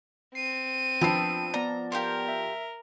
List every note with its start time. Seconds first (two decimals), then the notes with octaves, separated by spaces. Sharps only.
0.35 C4 C7 D#7
1.01 F3 B3 D4 G5 E6 C7
1.54 B3 D5 A#5
1.92 G4 A#4 F5 C6
2.28 E5